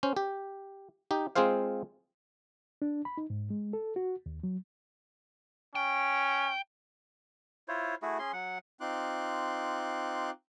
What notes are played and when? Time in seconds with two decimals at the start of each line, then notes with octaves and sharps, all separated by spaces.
0.03 C#4 C5
0.17 G4
1.11 D#4 G4
1.36 G#3 C4 F4 G#4 C5 F5
2.82 D4
3.05 B5
3.17 D#4
3.30 G#2
3.50 G#3
3.73 A4
3.96 F#4
4.26 D#2
4.43 F#3
5.75 C#4 G5
7.68 E4 F4 C5 C#5
8.02 A3 E4 F#4 G#4
8.19 C#4 G#4 C6
8.33 F#3 F#5
8.81 C4 D#4 F4 C6 D6 F#6